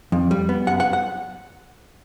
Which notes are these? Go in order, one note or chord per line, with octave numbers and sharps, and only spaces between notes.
F2
G3
B3
F#2 F#5
F#5
F#5